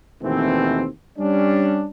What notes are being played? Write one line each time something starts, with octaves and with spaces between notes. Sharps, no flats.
D#2 B2 E3 A3 C4
G3 C#4 D4